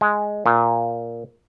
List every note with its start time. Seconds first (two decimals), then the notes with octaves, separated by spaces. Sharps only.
0.01 G#3
0.46 A#2